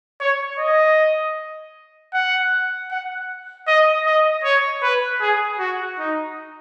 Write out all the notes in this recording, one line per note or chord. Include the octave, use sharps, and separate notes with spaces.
C#5
D#5
F#5
F#5
D#5
D#5
C#5
B4
G#4
F#4
D#4